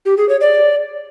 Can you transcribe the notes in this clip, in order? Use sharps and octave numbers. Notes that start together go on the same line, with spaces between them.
G4
G#4
C#5
D5